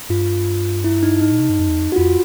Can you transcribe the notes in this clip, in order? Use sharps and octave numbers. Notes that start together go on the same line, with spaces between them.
G2 F4
E4
D#4
G#2 D#4
A#2
C3
G2
F#2
E2
F2
F#4
F2 F4